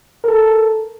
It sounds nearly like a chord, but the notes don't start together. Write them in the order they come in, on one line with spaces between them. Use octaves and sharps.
A#4 A4 A5